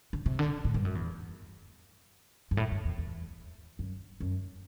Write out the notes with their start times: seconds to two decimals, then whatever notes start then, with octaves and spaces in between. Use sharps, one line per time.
0.13 D3
0.26 C3
0.39 D3
0.65 A2
0.74 G2
0.85 F#2
0.95 E2
2.51 G2
2.57 A2
2.71 G2
2.85 E2
2.98 E2
3.79 F#2
4.20 F#2